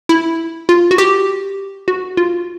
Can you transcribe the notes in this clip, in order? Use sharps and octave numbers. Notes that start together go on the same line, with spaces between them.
E4
F4
F#4
G4
F#4
F4